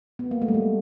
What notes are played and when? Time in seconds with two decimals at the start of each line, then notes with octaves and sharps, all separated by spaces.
0.19 B3
0.31 A#3
0.42 A3
0.48 G3
0.54 G#3